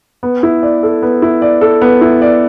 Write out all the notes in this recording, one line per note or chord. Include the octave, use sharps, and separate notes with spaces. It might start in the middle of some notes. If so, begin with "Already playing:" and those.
B3
E4
D5
A4
B3
E4
D5
A4
B3
E4
D5